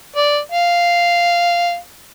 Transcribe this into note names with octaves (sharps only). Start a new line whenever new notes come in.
D5
F5